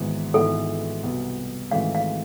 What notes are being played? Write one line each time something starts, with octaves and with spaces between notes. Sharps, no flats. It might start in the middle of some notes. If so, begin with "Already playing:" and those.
Already playing: G#1 G#2 E3 B3
G#1 G#2 E3 B3 E4 A4
C2 B2 B3
G#1 G#2 E3 A3 C4 F5
F5